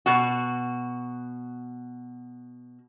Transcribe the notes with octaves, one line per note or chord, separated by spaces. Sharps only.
B2 F#4